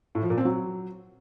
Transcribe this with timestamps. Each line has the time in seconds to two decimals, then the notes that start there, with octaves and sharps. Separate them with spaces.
0.15 A2
0.22 F3
0.30 A#2
0.38 C4
0.45 F#3